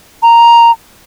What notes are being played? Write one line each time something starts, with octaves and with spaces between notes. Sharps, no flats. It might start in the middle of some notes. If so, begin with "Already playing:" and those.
A#5